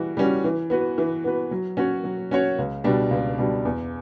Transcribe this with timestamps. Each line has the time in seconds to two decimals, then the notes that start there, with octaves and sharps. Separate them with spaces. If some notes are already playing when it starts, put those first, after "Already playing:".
Already playing: E3 G3 F#4
0.17 G3 C#4 F#4
0.44 E3
0.70 B3 F#4 B4
0.98 E3
1.24 B3 F#4 B4
1.51 F#3
1.77 C#4 F#4 C#5
2.04 F#3
2.31 C#4 F#4 C#5
2.58 C#2
2.84 B2 G3 D4
3.11 C#2
3.38 B2 G3 D4
3.65 E2